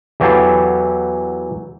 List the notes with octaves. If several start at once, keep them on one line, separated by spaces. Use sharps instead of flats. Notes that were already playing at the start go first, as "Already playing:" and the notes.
E2 E3 F#3 G4 A4 F5